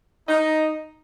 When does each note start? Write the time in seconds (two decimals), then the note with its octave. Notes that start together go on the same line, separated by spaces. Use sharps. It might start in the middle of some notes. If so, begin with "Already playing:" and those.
0.29 D#4